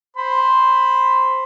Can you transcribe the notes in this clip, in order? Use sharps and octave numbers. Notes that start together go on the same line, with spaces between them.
C5 B5 C6